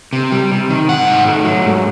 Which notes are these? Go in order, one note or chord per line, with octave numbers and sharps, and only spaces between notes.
C3
G3
C3
D#3
G#2 F#5
D#3
A3
F#3
G#2